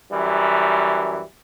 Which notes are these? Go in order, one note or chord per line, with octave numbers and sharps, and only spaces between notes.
F#2 E3 G3